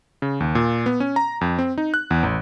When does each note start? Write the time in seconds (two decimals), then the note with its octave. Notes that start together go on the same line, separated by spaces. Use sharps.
0.22 C#3
0.40 D#2
0.55 A#2
0.86 B3
1.00 C#4
1.16 A#5
1.41 F2
1.59 C4
1.78 D#4
1.94 F#6
2.11 E2
2.23 A1